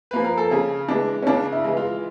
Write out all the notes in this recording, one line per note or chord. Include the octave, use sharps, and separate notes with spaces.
F3 A#3 B4
A#4
A4
C#3 G#4
E3 G#3 D4
C#4
C#3 D4
E4
E3 G#3
F4